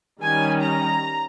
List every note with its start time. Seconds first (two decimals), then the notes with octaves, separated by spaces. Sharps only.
0.22 D#3 G3 C#4 G#5
0.63 A#5